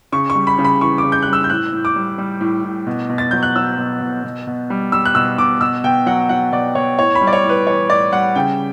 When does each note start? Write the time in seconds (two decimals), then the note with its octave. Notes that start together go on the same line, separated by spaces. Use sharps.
0.12 C#3 C#6
0.30 C#6
0.35 G3
0.47 B5
0.58 C#3
0.64 B5
0.81 E3 C#6
0.98 D6
1.04 C#3
1.12 G6
1.23 G3 F#6
1.33 E6
1.44 G6
1.50 A2 F#6
1.73 A2
1.85 D6
1.96 G3
2.18 G3
2.41 A2
2.64 A2
2.87 B2
3.09 B2
3.18 A6
3.31 F#3 G6
3.43 F#6
3.56 F#3 E6
3.78 B2
4.01 B2
4.24 B2
4.47 B2
4.70 G3
4.92 G3 E6
5.05 F#6
5.15 B2 E6
5.38 B2 D6
5.61 B2 E6
5.84 B2 G5
6.06 F#3 F#5
6.29 F#3 F#5
6.52 B2 D5
6.75 B2 C#5
6.98 A2 C#5
7.15 B5
7.21 G3
7.27 D5
7.33 C#5
7.44 A2
7.49 B4
7.66 E3 C#5
7.90 A2 D5
8.12 G3 F#5
8.35 C#3 G5